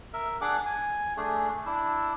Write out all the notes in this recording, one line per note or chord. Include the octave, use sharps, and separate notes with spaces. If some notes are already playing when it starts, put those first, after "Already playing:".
A#4 E5
D4 G#4 F#5 D6
G#5
A3 D4 G#4
D4 E4 E6